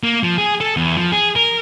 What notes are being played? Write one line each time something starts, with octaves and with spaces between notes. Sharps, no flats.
A#3
F3
G#4
A4
E2
F3
G#4
A#4